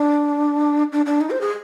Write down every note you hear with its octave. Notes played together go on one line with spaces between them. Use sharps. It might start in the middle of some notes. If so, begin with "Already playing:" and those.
Already playing: D4
D4
D4
D#4
C5
G#4